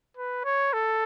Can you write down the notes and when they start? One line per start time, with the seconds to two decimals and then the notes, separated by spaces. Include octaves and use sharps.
0.17 B4
0.45 C#5
0.73 A4